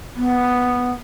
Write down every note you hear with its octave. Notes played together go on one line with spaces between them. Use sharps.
B3